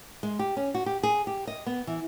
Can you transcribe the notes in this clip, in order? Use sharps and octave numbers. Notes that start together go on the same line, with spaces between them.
G#3
G4
C#4
F#4
G4
G#4
G4
D#5
B3
E3